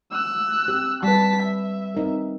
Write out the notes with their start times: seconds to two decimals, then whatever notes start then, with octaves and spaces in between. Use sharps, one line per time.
0.12 E6 F#6
0.68 C4 G4
1.03 G3 B4 A5 B6
1.42 E5
1.95 C4 D#4 A#4